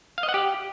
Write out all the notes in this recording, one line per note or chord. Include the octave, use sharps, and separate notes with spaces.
F5
D#5
F#5
G4